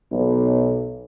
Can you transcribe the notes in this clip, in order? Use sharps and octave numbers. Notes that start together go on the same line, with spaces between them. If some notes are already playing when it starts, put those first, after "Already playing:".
B1